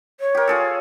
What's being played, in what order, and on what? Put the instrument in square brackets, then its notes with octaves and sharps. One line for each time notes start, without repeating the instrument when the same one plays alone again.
[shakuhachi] C#5
[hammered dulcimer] G4 A#4
F4 G#4 A4